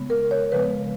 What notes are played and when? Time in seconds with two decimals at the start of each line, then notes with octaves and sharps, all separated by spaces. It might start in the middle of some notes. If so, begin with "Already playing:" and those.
Already playing: C#3 G#3 B3
0.10 A#4
0.31 C#5
0.52 C#3 F3 G#3 B3 B4